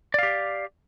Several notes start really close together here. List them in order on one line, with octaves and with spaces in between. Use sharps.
D5 F5 G4